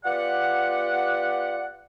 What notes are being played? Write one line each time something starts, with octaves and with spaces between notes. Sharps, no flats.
B3 F4 G4 D5 F#5